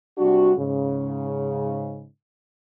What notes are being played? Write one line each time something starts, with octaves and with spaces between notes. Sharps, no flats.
C3 G3 D4 F#4
G#2 C#3